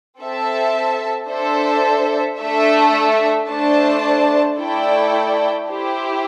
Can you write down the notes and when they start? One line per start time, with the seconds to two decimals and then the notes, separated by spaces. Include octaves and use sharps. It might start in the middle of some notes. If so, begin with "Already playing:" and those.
0.19 C4 A4 E5 A5
1.29 D4 A4 C5 E5
2.39 A3 D4 A4 E5
3.49 A3 D4 C5 A5
4.59 A3 E4 A4 D5 G5
5.69 E4 G4 C5